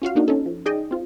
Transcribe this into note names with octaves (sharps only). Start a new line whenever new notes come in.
C#4 F4 F#4 F5
A#3 D4 D#4 F#4
C#4 D#4 A4
F3
D#4 G#4 D5 D#5 G5
C4 F4